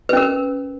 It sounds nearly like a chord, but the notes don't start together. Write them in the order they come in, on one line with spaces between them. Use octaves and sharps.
B4 C#4 A#4